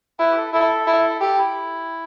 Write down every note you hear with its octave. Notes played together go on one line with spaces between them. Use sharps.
E4 B4
G4
A4
E4 A4
E4
G4 A4
E4